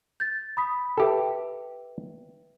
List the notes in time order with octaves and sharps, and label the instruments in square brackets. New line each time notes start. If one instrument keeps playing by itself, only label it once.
[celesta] G6 A6
B5 D#6 B6
[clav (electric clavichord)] G4 A4 [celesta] B4 E5 G5